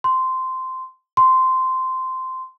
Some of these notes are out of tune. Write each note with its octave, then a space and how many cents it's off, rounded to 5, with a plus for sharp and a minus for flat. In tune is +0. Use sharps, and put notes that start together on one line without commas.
C6 -10
C6 -15